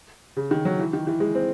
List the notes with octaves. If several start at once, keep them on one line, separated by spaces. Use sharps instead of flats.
C#3
D#3
F#3
E3
D#3
E3
G#3
C4